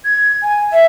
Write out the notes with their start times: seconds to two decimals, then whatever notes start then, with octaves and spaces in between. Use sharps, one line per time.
0.05 G#6
0.43 G#5
0.73 E5